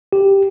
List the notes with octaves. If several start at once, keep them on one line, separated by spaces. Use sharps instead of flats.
G4